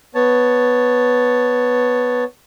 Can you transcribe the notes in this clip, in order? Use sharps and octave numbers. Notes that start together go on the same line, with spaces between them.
B3 C#5 A5